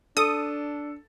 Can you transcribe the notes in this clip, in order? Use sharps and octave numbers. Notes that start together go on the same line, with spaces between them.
D4 A4 D#6